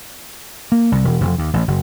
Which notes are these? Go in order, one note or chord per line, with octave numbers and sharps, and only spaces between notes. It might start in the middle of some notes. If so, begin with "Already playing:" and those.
A#3
C2
E1
F1
D#2
A1
F#1